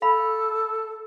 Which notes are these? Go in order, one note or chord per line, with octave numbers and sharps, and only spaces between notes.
A4 F5 B5